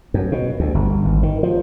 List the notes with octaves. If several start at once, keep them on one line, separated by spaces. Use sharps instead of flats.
F#2
B2
D2
G1
G#1
D#3
F3